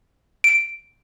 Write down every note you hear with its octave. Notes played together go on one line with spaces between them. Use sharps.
D7